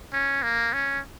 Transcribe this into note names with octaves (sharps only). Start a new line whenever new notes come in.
C#4
A#3
C#4